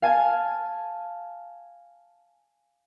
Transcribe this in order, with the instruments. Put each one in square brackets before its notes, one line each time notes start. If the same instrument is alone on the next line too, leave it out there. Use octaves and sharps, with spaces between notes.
[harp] F5 G#5 A5 G#6